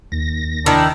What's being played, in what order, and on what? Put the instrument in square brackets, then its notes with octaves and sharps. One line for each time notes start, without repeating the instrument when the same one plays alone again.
[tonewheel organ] D#2 A#6
[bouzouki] D#3 E4 [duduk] D4